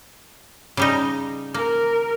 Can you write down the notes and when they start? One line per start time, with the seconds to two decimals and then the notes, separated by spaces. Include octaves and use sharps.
0.77 C#3 G3 D#4
1.54 A#3 A#4